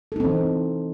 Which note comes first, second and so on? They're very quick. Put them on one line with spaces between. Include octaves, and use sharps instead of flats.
A4 D#4 C4 E3